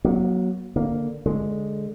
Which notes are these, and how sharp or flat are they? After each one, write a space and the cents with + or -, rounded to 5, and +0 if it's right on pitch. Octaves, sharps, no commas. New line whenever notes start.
F#3 +0 A#3 +40
D3 +0 A#3 +0
D3 -10 G#3 +0